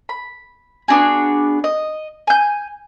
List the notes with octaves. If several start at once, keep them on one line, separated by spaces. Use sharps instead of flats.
B5
B3 D4 F#4 G#4
D#5
G#5 G6